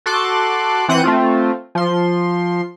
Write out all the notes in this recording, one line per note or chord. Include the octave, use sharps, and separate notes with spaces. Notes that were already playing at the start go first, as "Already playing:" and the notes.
F#4 A4 C6 D6 F#6
E3 C4 F#5 F#6 G6 D#7
A3 C4 F4
F3 C6